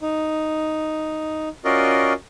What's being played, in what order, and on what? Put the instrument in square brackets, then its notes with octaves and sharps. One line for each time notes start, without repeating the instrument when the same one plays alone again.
[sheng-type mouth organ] D#4
C#4 F4 F#4 A#4 D5 D#5